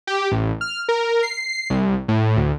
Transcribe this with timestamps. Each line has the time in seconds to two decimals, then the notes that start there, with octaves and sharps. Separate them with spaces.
0.07 G4
0.31 A1
0.61 F6
0.89 A#4
1.23 C7
1.70 C2
2.08 A2
2.37 D2